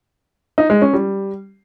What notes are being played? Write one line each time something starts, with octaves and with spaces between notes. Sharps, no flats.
D#4
G#3
C#4
G3